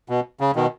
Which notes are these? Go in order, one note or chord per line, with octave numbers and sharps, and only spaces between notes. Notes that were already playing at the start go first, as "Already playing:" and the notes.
B2
C#3
B2 D#3